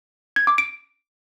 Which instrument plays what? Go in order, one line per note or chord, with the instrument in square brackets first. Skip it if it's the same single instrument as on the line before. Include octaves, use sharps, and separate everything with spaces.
[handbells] G#6
D6
D7